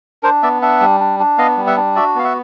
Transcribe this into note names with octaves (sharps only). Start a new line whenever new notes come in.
D4 A#4 C5
B3 D5 E5
D4 E5 F#5
G3
D4
D4
B3 D#5 F5
G3
E5 F#5
D4
F#4 D5 E5
B3 F5
E5 F#5